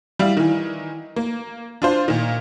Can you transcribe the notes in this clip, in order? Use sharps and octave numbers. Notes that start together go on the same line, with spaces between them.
G3 E4 F5
D#3 E3
A#3
D4 F4 C5
A#2 D#3